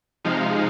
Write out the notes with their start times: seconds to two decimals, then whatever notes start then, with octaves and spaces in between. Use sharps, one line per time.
0.25 C3 F3 G#3 D#4 F5